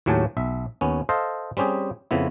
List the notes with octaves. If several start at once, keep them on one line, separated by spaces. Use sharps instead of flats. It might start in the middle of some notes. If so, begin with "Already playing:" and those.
D#2 A2 F#3 G4 G#5 A5
B1 E5
D#2 B3 C#4
A4 C5 D#5 F5
G3 C4 C#4 G4 G#4
F2 C#3 B3 E4